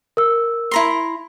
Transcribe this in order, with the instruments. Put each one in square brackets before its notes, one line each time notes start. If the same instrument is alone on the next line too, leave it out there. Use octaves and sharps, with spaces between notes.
[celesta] A#4 E6
[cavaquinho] E4 A#5 C6